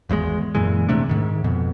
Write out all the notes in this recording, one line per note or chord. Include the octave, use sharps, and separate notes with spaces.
G#1 E2 E3 G#3
F#2 A#2 E3 G#3
D#1 C3 A3 D4
G#2 D#3
F2 B2